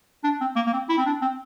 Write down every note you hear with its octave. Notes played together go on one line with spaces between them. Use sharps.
D4
C4
A#3
A#3
C4
E4
C4
D4
C4